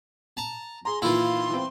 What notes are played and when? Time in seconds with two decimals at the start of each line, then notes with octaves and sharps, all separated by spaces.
0.37 A5 A#5
0.85 G#4 A#5 C6
1.02 A#2 D#3 E3 E4 F4 C6
1.50 E3 C4